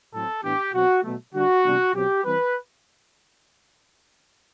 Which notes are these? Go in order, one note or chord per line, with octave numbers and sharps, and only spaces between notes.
A2 F#3 C4 A4
A2 E3 B3 D4 G4
B2 F#3 C4 F#4
B2 F#3 A3
D3 G3 D4 F#4
C3 E3 G3 B3 D4
B2 F#3 C4 G4
E3 G3 C4 B4